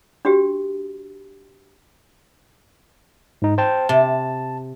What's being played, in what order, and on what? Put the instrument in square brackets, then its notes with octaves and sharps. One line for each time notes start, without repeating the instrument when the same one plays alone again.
[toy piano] D4 F#4 G4
[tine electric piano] G#2 D#4
C5 G5 A5
[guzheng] C3 [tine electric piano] A5